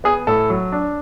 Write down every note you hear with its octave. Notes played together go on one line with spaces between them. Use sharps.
B3 G#4
A2 A4
F#3
D4